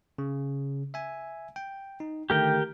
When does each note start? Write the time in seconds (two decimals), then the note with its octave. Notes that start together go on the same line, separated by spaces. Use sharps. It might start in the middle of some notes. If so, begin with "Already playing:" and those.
0.18 C#3
0.94 E5 G#5
1.56 G5
2.00 D#4
2.30 D3 D#3 A3 G4 A#4 G5